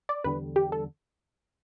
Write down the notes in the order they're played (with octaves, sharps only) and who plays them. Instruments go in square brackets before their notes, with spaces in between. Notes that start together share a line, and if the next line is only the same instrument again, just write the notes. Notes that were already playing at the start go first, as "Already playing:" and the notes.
[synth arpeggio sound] D5
E2 D3 G3 B4
G4
A4